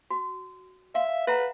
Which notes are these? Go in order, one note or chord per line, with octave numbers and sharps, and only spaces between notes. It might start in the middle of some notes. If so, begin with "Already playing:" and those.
F#4
E5 F5
B4 E5 F#5 A#5